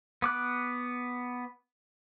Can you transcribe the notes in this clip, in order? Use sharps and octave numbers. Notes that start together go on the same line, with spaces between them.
B3 D6 F#6